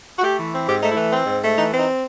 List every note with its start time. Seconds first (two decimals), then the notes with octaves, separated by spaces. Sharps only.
0.18 F#4
0.23 A3 G4
0.37 E3
0.53 C4
0.67 G#2 G4
0.82 A3 D#4
0.90 E4
0.96 E3
1.12 C4
1.26 G#2
1.41 A3
1.57 E3 D#4
1.71 C4
1.79 D#4